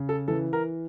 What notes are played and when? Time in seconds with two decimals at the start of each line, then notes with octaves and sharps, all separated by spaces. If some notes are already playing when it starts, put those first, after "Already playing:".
Already playing: C#3
0.09 A4
0.28 E3 A4
0.53 A#4